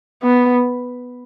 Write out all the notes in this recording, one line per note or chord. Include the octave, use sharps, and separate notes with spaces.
B3